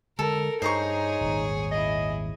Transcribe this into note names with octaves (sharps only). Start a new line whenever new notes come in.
D3 G#3 A4 A#4
G2 D#4 G#4 C5 C#5 A#5 C#6
D#1 G#1
E4 G#4 D#5